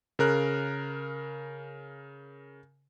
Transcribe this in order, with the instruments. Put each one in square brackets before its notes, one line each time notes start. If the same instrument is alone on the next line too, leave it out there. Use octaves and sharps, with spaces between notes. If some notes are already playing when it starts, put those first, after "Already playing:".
[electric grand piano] C#3 A#4 F#6